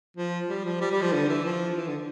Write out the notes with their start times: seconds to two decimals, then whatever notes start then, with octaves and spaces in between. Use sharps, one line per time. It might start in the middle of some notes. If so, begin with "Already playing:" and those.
0.17 F3
0.49 G3
0.65 F3
0.81 G3
0.91 G3
1.02 F3
1.13 D3
1.29 E3
1.45 F3
1.77 E3
1.87 D3